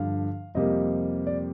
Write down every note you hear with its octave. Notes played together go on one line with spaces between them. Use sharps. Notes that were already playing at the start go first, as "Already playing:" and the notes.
Already playing: G2 D3 F3 F5
F2 C3 G3 A#3 D#5
D5